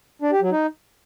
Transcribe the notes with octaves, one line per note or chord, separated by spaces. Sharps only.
D4
G4
F#3
D#4